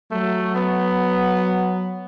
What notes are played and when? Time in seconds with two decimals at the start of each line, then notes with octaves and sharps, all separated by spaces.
0.12 F#3 A3
0.56 B3